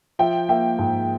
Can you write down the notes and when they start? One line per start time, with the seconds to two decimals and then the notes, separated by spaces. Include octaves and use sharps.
0.19 F3 E5 G5
0.49 A#3 E5 G5
0.79 G#2